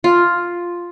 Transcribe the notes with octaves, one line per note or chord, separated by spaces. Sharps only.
F4